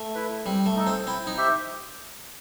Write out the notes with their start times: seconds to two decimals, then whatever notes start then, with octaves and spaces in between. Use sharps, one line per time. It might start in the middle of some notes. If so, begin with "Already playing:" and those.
Already playing: A3
0.15 E4 B4
0.46 G3 C4
0.66 A3
0.76 D#4 A4
0.87 C4
1.07 C4 E4
1.27 D#4
1.38 G4 C5 E5